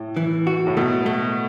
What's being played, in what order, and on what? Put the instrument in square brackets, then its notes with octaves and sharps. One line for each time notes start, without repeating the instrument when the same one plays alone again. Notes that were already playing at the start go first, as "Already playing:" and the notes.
Already playing: [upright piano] A2
[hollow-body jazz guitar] E3
F#4
[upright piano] A2
[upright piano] B2 [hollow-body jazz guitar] A3
[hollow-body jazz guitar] A3